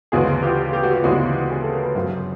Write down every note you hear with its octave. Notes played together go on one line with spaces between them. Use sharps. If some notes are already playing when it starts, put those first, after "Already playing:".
D2 C#3 E3 G#3 B3 F#4 G#4
F4 G4
G4
F#4
F4 G4
D2 C#3 E3 G#3 B3 E4 F#4
G#4
A4
A#4
B4
F#2 C#3 F#3 A#4 C5